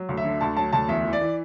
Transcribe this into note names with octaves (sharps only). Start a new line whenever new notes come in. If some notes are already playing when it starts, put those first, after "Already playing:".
Already playing: F#3
D2
E5
D3
D2 A5
F#3 A5
D2 A5
E2 E5
E3
D5
E3